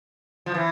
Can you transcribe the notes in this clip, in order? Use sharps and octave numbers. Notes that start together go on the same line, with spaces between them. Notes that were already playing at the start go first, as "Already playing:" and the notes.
F3
E3